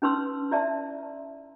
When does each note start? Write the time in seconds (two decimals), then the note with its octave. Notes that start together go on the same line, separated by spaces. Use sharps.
0.02 C#4 D#4 B4 C6 E6
0.51 E4 D5 E5 A5